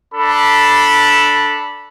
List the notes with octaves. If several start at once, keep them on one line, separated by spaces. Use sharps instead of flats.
D4 A4 B5